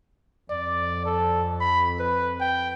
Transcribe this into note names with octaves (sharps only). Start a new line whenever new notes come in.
F2 D5
A4
B5
B4
G5